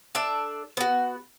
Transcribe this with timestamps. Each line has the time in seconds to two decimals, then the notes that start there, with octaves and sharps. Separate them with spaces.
0.15 D4 A4 D5 E5
0.77 B3 F#4